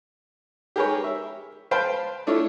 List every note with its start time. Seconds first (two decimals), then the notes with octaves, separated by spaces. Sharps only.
0.76 G4 G#4 A#4 B4 C#5
1.04 E5
1.71 B4 C5 F5 G5 A5
2.27 A3 D4 E4 F4 C#5